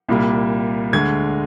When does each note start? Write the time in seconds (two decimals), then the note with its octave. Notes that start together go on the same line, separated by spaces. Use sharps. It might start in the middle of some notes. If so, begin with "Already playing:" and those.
0.09 C2 A#2 G3 A#3
0.93 D2 D3 G#3 G#6